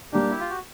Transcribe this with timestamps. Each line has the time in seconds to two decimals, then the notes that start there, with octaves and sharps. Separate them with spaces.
0.12 G3 A#3 D4 G4
0.30 E4
0.40 F4
0.50 F#4